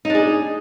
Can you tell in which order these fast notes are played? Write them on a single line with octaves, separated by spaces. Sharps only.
D#4 D4 G#4